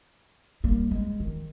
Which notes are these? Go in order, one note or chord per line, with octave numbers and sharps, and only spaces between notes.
G3 A#3
G#3
D#3